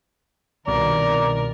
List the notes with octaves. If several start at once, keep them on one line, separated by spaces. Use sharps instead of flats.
C2 B2 D#3 A#4 D5